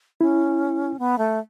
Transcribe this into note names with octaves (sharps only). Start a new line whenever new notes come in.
C#4 E4
B3
A3